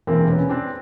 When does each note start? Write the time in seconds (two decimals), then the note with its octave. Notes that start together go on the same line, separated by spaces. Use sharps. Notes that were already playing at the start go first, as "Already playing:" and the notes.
0.07 E1 E2 C3 A#3 C4
0.29 B3 C#4
0.49 C4 D4